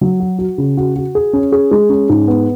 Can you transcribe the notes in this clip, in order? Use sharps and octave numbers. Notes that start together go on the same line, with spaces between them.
F#3
F#4
F#4
C#3
F#4
F#4
G#4
C#4
G#4
G#3
C#4
G#2
B3